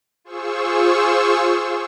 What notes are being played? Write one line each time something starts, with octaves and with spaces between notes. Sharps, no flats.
F4 G#4 C5 C#6 E6